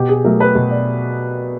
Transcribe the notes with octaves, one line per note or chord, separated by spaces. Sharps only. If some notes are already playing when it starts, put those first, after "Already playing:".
Already playing: B2 G4
G#4
F#3 A3 A#4
B4
B2
D5